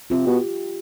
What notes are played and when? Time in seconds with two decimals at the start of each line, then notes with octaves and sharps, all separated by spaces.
0.10 C3 F4 G4
0.27 B2